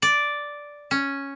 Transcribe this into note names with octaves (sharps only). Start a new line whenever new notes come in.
D5
C#4